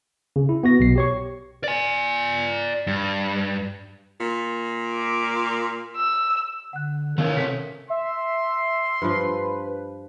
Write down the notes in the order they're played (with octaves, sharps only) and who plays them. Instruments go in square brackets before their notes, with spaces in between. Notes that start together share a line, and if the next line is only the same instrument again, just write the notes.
[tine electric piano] C#3
E4
B3 F#4 A#6
B1 B2 C7
G4 C#5 C#6
[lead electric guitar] D5 G#5
G2
[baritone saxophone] A#2
[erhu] D6
E6
[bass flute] D3 [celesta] F#5 F#6
[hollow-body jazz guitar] D#3 [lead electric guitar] A3 C#4 [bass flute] A#4 [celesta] F5
[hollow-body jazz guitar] C3 A4 F#5 [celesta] B6
[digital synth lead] E5 [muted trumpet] C6
[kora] G2 F3 [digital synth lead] B4